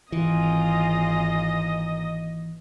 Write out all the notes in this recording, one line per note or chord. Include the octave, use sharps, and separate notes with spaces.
G#1 E3 A#3 C4 F4 G#4 D#5